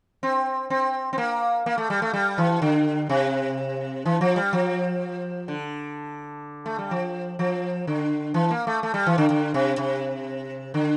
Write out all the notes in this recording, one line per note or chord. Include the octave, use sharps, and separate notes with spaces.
C4
C4
C4
A#3
A#3
A3
G3
A3
G3
E3
D3
C3
E3
F3
G3
F3
D3
A3
G3
F3
F3
D3
E3
A#3
A3
A3
G3
E3
D3
D3
C3
C3
D3